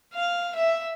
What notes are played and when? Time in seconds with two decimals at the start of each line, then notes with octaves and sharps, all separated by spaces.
0.13 F5
0.55 E5